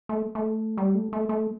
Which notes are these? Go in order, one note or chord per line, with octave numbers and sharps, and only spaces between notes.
A3
A3
G3
A3
A3
A3